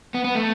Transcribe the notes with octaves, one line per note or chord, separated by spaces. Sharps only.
B3
B3
A3